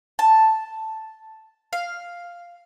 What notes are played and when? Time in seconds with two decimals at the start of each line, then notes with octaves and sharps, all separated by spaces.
0.19 A5
1.73 F5